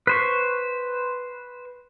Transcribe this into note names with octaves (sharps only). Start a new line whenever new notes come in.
B4 C5 C#6